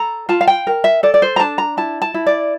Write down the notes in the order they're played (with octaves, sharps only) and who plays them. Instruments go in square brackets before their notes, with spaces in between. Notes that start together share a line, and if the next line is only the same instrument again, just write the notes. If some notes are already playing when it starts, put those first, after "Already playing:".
Already playing: [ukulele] A4 A#5
F4 A5
F5
G5
A#4
E5
A4 D5
D5
C5
A#5
D4 A5
A#5
E4 A5
A5
E4
D5